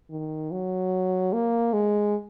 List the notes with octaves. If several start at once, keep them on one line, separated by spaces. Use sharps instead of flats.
D#3
F#3
A#3
G#3